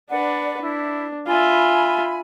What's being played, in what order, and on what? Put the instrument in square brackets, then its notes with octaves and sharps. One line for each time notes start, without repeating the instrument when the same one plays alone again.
[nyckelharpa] D4 B4 [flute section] D5 F#5
[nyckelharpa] D4 [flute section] E4
[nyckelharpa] F4 E5 [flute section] G#5 B5